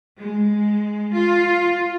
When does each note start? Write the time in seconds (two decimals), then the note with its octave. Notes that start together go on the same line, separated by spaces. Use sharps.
0.19 G#3
1.13 F4